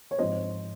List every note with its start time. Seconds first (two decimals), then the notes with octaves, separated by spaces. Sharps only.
0.11 C#5
0.19 G#2 F3 C4 C5 D#5